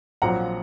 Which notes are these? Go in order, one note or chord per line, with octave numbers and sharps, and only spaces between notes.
A#1 A#2 F#3 C4 F#5 A#5